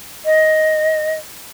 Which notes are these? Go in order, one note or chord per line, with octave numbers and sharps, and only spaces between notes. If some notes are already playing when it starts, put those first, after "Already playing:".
D#5